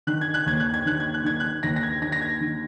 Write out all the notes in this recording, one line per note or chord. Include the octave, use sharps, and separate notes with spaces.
D#3 F#6
G#6
F#6
D#2 G#6
F#6
G#6
D#3 F#6
G#6
F#6
D#3 G#6
F#6
D#2 A#6
A#6
G#6
D#3 A#6
A#6
G#6
D#3